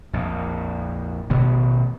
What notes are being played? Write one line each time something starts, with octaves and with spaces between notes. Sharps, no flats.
A#1 F2
A1 B2 D#3 B3